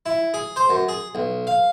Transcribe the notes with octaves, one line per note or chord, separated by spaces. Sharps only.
E4
G#4
C5
F#2
G#4
B1
F5